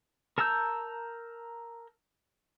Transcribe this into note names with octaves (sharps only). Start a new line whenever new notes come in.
A#4 A5 A#5 E6 G6